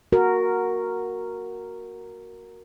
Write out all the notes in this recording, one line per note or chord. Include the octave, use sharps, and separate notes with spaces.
F#4 A#4